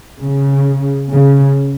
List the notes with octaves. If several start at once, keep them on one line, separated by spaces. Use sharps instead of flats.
C#3
C#3